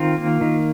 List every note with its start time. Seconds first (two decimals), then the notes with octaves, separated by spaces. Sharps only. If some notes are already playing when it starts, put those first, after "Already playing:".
Already playing: D#3 C4 F4
0.18 A#3
0.41 D#3